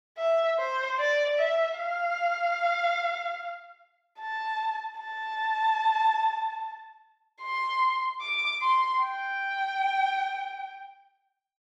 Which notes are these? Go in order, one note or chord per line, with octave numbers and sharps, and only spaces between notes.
E5
C5
D5
E5
F5
A5
A5
C6
D6
C6
G5